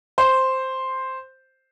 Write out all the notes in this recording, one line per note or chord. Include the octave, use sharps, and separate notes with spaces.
C5